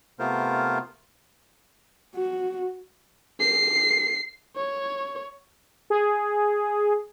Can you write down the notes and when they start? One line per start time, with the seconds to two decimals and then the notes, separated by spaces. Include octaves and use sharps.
0.19 C3 A3 B3 F4 A#4 C5
2.15 F#4
3.40 C7
4.57 C#5
5.90 G#4